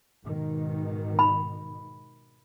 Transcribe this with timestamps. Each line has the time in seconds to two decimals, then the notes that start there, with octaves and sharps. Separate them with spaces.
0.23 G#2 B2 D#3
1.19 B5